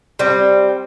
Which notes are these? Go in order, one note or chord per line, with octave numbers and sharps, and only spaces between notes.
G3 C4